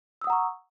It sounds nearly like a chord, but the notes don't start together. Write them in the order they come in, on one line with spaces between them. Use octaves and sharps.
E6 D#6 F#5 A#5 C#6